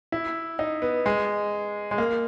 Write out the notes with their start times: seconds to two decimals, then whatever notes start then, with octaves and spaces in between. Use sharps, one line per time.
0.12 E4
0.59 D#4
0.82 B3
1.06 G#3
1.91 G#3
1.98 A#3